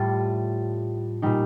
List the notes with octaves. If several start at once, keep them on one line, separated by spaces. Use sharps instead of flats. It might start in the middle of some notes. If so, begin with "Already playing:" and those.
Already playing: A2 G3 F4 A4
A#2 G3 D#4